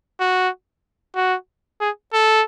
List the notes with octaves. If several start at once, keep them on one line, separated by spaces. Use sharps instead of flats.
F#4
F#4
G#4
A4